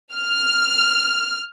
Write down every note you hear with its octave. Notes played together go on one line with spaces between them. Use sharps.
F6